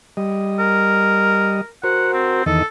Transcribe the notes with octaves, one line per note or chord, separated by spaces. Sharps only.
G3 D#5
A#4
F#4 A#4 C5 F#5
C4
E2 D#3 A4 D#5